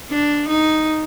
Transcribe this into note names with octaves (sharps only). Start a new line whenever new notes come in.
D4
D#4